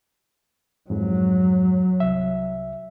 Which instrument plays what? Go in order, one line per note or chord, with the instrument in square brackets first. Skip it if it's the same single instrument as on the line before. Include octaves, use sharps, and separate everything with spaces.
[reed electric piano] F2 G#2 [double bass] F#3
[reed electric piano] C2 E5